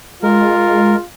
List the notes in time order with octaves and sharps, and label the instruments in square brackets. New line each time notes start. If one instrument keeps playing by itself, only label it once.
[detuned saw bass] G#3 [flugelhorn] F4 [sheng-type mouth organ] A#4